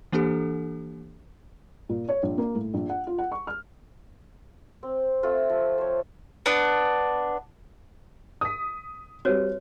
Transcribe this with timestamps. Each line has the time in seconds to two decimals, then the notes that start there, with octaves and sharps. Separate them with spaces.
0.12 E3 A#3 D4 G4 A4
1.89 A#2
2.09 C#5
2.23 A#1
2.38 A#3
2.55 A2
2.74 A#1
2.89 F#5
3.07 F4
3.18 F#5
3.32 C#6
3.47 F6
4.83 C4
5.23 A3 C4 F4 A4
5.49 F3
5.78 C5 C#5
6.46 B3 D4
8.41 D#6 B6
9.25 G3 C4 F#4 B4 C#5